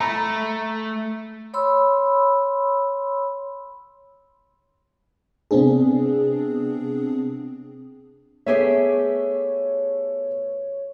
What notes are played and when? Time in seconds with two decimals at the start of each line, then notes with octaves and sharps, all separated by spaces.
0.01 A3 A#5 B5
1.54 C#5 B5 C6 E6
5.51 C3 B3 C4 D4 G#4
8.46 A3 B3 G4 G#4 C#5 E5